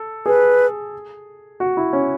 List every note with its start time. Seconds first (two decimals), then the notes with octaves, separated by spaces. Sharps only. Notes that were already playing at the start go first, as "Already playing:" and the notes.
Already playing: A4
0.26 G#4 B4
1.60 F#4
1.77 E4
1.93 C#4